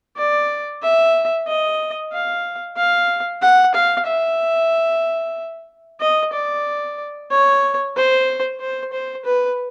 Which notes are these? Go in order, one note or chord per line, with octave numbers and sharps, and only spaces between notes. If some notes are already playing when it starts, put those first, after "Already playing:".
D5
E5
D#5
F5
F5
F#5
F5
E5
D#5
D5
C#5
C5
C5
C5
B4